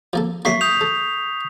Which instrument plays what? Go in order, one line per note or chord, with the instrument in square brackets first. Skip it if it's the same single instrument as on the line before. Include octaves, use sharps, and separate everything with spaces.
[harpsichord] F3 A#3 A4
[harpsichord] F#3 A3 A#3 [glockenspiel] C#6 B6 C7
[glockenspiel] D#6 G6 F7
[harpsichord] A4